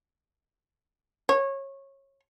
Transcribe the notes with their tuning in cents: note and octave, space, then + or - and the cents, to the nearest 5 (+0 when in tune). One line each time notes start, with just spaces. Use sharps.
C#5 -20